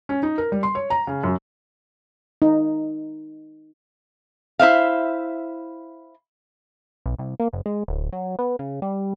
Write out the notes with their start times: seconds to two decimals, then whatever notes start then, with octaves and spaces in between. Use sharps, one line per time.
0.09 C#4
0.23 D#4
0.38 A#4
0.52 G3
0.63 C6
0.75 C#5
0.90 A#5
1.07 C#3
1.24 F#2
2.42 D#4
4.59 E4 C5 E5 F5
7.06 B1
7.19 C2
7.40 A#3
7.53 F#1
7.66 G#3
7.88 D1
8.12 F#3
8.39 B3
8.59 C#3
8.82 G3